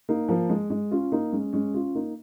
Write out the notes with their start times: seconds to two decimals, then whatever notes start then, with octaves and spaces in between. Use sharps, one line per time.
0.09 A#3 D#4
0.29 F3 A#3
0.49 G#3
0.70 G#3
0.91 C#4 F4
1.12 A#3 D#4
1.33 G#3 C#4
1.53 G#3 C#4
1.74 C#4 F4
1.95 A#3 D#4